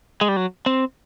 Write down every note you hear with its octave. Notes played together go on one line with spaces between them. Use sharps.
G#3
G3
F#3
C4